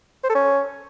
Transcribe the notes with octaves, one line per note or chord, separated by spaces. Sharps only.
C5
A4
C#4